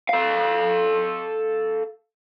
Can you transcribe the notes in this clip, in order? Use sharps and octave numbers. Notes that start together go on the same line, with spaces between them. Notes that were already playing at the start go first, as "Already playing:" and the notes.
A4 F5